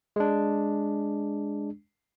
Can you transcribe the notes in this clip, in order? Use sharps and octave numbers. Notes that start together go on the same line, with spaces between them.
G#3 D4